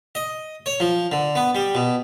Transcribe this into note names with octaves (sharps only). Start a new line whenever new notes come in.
D#5
C#5
F3
D3
B3
G3
B2